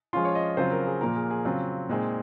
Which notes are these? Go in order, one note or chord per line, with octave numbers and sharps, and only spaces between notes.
F3 G#3 C#4 F4 C6
C#5
D#5
C#3 F#3 C4 F4 C5
A#4
G#4
A#2 F3 A#3 F4 A#4
G#4
G#4
C#3 F#3 C4 F4
A#2 G#3 C4 D#4